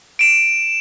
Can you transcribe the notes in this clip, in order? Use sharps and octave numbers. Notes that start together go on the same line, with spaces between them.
D7 E7